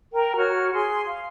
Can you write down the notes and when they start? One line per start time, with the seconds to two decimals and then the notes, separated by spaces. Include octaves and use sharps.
0.13 A#4 G5
0.36 F#4 C#5 F6
0.73 G#4 C6
1.07 F5